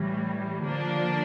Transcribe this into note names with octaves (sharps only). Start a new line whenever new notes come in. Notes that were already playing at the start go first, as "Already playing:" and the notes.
Already playing: A2 E3 G3
D3 F3 A#3 D4